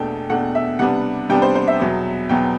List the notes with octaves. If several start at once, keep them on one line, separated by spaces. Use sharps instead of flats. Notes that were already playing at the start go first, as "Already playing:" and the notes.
Already playing: E2 B2 A3 D4 G5
E2 B2 A3 D4 F#5
E5
C3 G3 B3 D4 F#5
C3 G3 B3 D4 G5
C5
C5
E5
E2 B2 F#3 B3
E2 B2 F#3 B3 G5